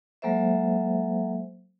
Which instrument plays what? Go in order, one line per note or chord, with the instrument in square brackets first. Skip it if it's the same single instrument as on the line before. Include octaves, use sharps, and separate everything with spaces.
[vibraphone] F#3 G#3 A#3 A4 C5 E5